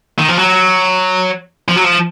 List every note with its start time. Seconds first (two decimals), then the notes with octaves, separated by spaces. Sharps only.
0.19 D#3
0.28 F3
0.37 F#3
1.68 F3
1.76 F#3
1.84 F3